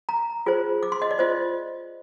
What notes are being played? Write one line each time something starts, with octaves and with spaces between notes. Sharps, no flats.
A#5
F4 G#4 C5
D6
C6
D#5
D5
F4 C5 D#5